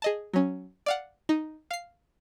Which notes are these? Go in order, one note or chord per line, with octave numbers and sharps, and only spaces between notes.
G#4 D#5 A5
F#3 C#4
D5 F5 F#5
D#4
F5 C7